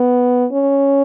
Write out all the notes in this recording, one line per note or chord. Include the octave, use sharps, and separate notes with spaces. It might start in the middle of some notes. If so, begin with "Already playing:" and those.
Already playing: B3
C#4